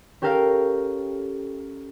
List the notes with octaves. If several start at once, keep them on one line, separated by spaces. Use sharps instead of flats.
C#4 G4 A4 A#4 F5